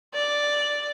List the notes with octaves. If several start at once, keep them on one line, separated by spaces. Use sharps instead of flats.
D5